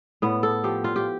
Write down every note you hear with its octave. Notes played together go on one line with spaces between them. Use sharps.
A2 B3
A4
F3 G4
F4
G4